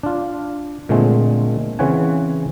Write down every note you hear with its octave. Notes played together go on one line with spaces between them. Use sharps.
D4 F4
A#2 D3 G#3 A3 C4
C#3 E3 C4 C#5 F#5 G#5